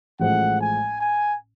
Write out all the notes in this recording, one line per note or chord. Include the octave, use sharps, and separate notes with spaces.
A1 A2 F3 G#3 F#5
G#5
G#5